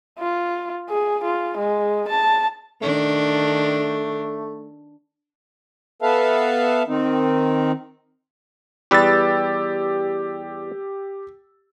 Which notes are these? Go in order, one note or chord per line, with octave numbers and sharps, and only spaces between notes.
F4
G#4
F4
G#3
A5
D#3 A3 D4
B3 A4 B4 E5 F5 A5
D#3 C4 D#4
E2 G3 G4 B4 E6 A6